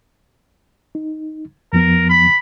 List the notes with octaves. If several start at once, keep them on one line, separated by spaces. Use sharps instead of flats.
D#4
F2 F3 B3 A#4
B5